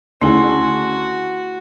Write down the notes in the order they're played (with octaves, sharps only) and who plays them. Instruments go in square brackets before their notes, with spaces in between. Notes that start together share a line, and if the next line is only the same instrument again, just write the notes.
[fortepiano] D2 C#3 [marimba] A3 E4 [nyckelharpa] F#4 [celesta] G#5 C6